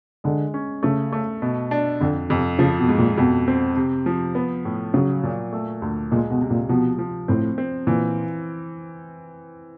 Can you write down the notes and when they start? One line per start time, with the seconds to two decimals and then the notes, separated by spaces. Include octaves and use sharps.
0.24 D3 G#3
0.54 C#4
0.83 C#3 A3
1.13 A3
1.42 B2
1.71 D4
2.01 F2 D3
2.29 F2 C3
2.59 C#3 F3
2.79 B2
2.89 G#2
2.98 A#2
3.17 F2 B2
3.48 C4
3.76 C3
4.06 F3
4.35 B3
4.65 A2
4.94 C#3 F#3
5.23 A#2
5.53 A3
5.82 D2
6.11 A#2 G#3
6.30 B2
6.41 C3
6.50 A#2
6.69 B2 F3
6.99 F3
7.28 A2 C4
7.58 C4
7.87 A#2 E3